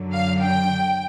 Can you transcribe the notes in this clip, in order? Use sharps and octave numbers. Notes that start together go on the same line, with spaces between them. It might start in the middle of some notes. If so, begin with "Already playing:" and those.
Already playing: F#2 D3 F#3
F5
G5